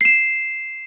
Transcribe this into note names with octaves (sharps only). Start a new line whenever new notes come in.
C7 E7